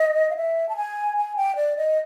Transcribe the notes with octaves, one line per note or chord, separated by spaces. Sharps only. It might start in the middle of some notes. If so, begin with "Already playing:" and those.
Already playing: D#5
F5
E5
A5
G#5
G#5
G5
D5
D#5